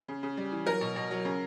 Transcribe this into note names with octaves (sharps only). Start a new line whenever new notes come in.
C#3
C#3
G3
E3
F#3 A#4
B2
B2
F#3
C#3